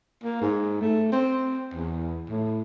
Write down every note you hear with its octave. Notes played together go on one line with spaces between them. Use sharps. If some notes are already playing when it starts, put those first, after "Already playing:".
A#3
G#2
A3
C4
E2
A2